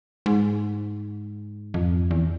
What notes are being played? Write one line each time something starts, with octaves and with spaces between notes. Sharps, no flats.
G#2
F2
E2